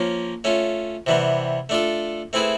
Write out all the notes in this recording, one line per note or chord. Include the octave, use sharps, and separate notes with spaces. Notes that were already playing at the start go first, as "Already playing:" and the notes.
Already playing: F3 A#3 C#4 F4
A3 C#4 F4
C3 E3 G3 B3
A3 D4 F4 A4
A3 C4 E4 G#4 B4